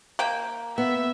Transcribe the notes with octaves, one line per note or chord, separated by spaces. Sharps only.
A#3 G5
B3 E5